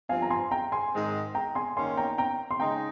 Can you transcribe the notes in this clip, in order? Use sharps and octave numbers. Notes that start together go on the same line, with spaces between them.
G2 F3 C4 F4 F5 G#5
A#5
G#5 C6
G5 A#5
G#5 C6
G#2 D#3 G#3 C4
G5 A#5
G#5 C6
D#3 A#3 C#4 G#5 C6
G5 A#5
G5 A#5
C6
C#3 G#3 D#4 G5 A#5